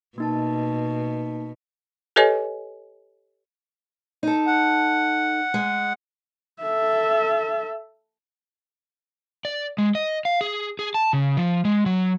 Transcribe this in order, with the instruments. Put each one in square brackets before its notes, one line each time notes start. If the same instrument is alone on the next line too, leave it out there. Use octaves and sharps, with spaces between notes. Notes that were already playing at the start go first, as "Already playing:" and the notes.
[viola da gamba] B2 [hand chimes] A#3 D#4 A5
[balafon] G4 A4 B4 C#5 D#5 G#5
[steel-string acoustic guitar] D#4 A4
[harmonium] F#5
[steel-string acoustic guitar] G#3
[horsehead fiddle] A4 E5
[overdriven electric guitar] D5
G#3
D#5
F5
G#4
G#4
A5
C#3
F3
G#3
F#3